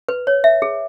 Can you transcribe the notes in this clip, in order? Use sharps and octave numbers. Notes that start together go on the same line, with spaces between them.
B4
C#5
E5
G#4